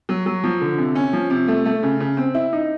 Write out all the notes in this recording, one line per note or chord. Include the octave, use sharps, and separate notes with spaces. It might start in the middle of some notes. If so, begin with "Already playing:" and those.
F#3
F#3
F3
D3
C3
C#4
F3
C3
A3
A3
C#3
C#3
C4
E4
D#4